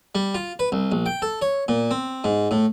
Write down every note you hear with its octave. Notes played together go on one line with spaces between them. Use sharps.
G3
F4
B4
C2
A#1
G5
A4
C#5
A#2
C4
G#2
A2